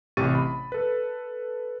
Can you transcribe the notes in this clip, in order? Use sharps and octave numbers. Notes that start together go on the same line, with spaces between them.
A1 C3 G4 C#6 A6 D#7
B5
A4 B4